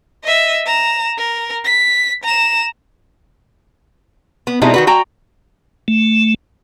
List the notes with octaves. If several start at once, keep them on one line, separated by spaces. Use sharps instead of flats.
D#5 E5
A#5 E7
A#4
B6
A#5 E7
B3
B2 G3 G#3 C4 D#4 E4
D#3 F#4 B4
F#4 G5 A#5
A3